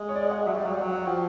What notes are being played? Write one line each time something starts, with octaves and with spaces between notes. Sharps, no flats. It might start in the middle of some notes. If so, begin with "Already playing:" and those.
Already playing: G#3
C#5
D5
F#5
F#3 E5
G3 D5
F#3 F5
G3
F#3 F#5
F#5
F3 G5